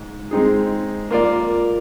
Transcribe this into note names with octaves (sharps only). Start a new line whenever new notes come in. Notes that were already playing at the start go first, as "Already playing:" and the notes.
Already playing: G#2
G#3 C4 D#4 G#4
A#3 F4 A#4 D5